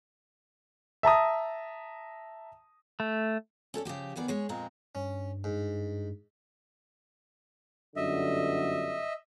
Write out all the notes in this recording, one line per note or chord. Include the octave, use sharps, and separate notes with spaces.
E5 A5 A#5 D#6
A3
C#4 A4 B4 D5
C#3 F3 G4 G5
D2 D#3 B3 G#4 D5
G#3 G#4 C#5
F2 A#2 G#3 C4 A#5
G2 C#4
G#2
G1 F#2 D3 D#5 E5